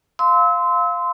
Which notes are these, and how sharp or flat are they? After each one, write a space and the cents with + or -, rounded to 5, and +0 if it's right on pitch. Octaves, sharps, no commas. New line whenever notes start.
F5 +0 C6 -20 E6 -30